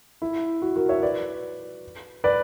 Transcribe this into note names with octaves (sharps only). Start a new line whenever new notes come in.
E4
F#4
F#4 A#4
C#5 E5
B4 D5
B4 D5